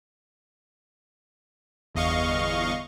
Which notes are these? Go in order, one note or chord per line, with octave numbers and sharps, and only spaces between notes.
G1 E2 D#5 F5 C#6